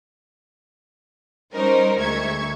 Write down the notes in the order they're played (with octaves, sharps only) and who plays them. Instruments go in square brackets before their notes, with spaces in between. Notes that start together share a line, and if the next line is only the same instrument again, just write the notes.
[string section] G3 C#4 D#4 A#4 C5
D2 G#3 E5 C#6 G#6